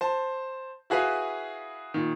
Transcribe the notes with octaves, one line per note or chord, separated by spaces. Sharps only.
C5 A5
E4 F#4 G#4 B4 F5
A#2 D#3